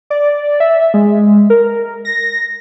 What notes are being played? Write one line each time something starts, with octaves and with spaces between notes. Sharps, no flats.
D5
E5
G#3
A#4
A#6